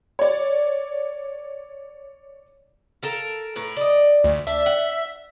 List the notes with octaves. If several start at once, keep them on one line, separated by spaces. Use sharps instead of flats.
C#5 D5
A4 A#4 F5
A2 A#4 B4
D5 D#5
D2
D4 E5
F#5